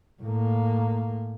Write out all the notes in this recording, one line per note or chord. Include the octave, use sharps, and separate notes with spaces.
A2 A#3